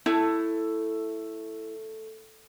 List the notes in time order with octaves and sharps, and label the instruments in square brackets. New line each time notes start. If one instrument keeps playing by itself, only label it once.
[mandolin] A3 [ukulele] E4